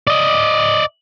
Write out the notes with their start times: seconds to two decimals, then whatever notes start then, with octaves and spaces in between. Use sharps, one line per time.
0.07 D5 D#5